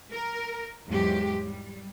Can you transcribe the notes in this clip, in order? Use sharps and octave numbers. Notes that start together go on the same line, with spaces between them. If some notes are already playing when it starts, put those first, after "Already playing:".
A#4
E2 G#2 F#3 G#3 G4
G3